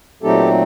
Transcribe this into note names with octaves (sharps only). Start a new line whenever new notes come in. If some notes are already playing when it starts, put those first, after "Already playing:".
A#2 F#3 A3 C4 D#4 G4 A4